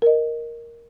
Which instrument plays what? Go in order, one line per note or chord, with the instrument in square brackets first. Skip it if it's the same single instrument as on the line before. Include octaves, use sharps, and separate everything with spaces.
[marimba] A#4 D#5